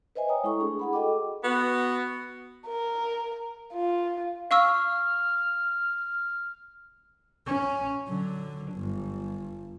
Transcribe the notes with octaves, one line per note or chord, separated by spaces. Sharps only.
B4 C5 D#5 E5 G#5
C#5 G5 G#5 A#5 D#6
G#3 E4 A4 C#6
A3 D4 G#4
G#4 F#5 B5
F#4 A4 D#5 G5 D6
B3 F#4
A#4
F4
F5 C#6 E6 F6
C#4
D3 F#3
G1